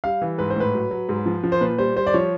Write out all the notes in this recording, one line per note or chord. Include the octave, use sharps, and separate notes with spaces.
G3 F5
E3
G#2 B4
C5
A2 B4
F#3
F#3
G#2
F3
F3
C5
A#2 B4
G3 C5
G3 C5
D5
F3 C#5